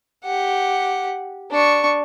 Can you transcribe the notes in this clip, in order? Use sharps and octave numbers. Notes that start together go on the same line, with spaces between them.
G4 F#5
D4 C#6